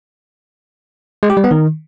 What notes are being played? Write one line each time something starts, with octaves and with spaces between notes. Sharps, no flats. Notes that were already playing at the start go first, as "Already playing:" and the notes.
G#3
G4
G3
B3
D#3